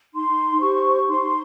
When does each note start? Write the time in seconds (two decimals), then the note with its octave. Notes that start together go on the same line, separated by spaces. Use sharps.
0.14 D#4 C6
0.61 G4 C5 C#6
1.08 D#4 C6